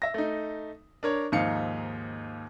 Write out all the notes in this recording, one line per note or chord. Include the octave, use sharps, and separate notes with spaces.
E5 A#6
A3 D#4
D4 A#4 C#5
D#2 G#2 F3 D#4 F5 C#7